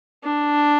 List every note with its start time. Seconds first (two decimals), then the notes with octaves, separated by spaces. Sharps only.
0.24 D4